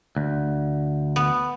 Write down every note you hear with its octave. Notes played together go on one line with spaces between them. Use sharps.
D2
B3